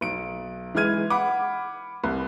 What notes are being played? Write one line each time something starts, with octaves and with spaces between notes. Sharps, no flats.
B1 D7
E3 G#3 E4 F6 G#6 D#7
F#5 B5 D6
C2